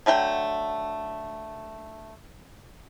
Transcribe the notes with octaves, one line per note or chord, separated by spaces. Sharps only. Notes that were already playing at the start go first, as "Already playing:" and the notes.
D3 F#3 A3 G5